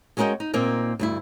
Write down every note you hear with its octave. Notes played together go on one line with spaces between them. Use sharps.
G#3 C#4 F#4 A#4 D#5 G5
D#4
A#2 A#3 C4 D#4 A#4
D2 G2 E4